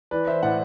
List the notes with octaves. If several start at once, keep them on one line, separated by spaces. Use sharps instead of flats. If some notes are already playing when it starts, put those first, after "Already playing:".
E3 B4 D5
C5 E5
A2 D5 F#5